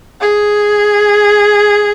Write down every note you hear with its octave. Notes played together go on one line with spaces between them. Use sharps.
G#4